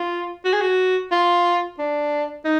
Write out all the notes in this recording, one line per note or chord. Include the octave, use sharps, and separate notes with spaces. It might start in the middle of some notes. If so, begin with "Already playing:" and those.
Already playing: F4
F#4
G#4
F#4
F4
D4
D#4